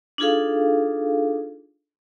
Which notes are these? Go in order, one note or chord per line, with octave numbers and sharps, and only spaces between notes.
D4 D#4 F4 G#4 A4 F5